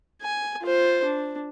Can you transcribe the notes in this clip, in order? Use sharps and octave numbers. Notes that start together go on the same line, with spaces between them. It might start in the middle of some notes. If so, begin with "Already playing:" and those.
G#5
F4 C5
D4